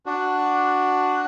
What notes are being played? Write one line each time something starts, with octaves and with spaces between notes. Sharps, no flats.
D4 F#4